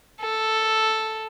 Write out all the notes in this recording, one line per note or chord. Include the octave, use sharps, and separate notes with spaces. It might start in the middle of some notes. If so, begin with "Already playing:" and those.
A4